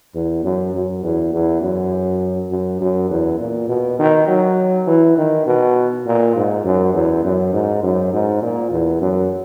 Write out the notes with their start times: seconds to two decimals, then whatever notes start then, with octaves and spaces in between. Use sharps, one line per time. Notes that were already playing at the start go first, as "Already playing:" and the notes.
0.15 E2
0.44 F#2
0.74 F#2
1.03 E2
1.33 E2
1.62 F#2
2.51 F#2
2.81 F#2
3.10 E2
3.39 A#2
3.68 B2
3.99 D#3
4.28 F#3
4.87 E3
5.17 D#3
5.47 B2
6.06 A#2
6.36 G#2
6.65 F#2
6.94 E2
7.23 F#2
7.53 G#2
7.83 F#2
8.12 G#2
8.42 A#2
8.71 E2
9.01 F#2